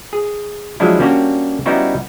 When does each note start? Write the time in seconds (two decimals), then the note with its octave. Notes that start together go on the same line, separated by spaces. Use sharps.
0.13 G#4
0.80 F3 F#3 G#3 D4 E4
0.99 G3 A#3 C#4 D4 F#4 G4
1.66 G3 B3 C#4 D#4 E4 F#4